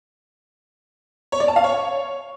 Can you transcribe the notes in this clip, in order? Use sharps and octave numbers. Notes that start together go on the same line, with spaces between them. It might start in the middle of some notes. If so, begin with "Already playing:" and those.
C#5
D5
A5
F5
C#5